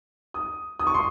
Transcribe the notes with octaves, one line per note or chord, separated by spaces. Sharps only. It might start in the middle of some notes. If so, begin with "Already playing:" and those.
D#6
D#6
C#6
C6